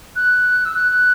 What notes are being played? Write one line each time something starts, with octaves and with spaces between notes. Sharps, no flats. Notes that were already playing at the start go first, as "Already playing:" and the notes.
F#6
E6
F#6